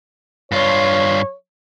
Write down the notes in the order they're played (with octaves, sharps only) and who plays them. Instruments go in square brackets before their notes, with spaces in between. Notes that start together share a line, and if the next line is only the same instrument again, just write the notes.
[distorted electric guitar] G2 F4 [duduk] C#5